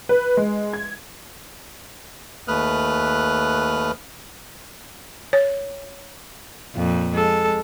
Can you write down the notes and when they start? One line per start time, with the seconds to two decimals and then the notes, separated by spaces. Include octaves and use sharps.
0.09 B4
0.37 G#3
0.73 G#6
2.48 D#2 A3 B4 D#6 F6 F#6
5.33 C#5
6.75 F2 A#2
7.15 G#3 A4